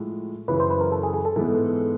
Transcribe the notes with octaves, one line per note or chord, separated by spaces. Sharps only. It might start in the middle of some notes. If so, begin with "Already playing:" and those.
Already playing: A2 F3 G#3
F#2 C#3 E3 B4
C5
B4
A#4
A4
G#4
G#4
A4
G#2 E3 G#3 B3 A4